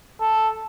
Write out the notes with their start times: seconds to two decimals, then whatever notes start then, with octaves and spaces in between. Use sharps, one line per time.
0.21 A4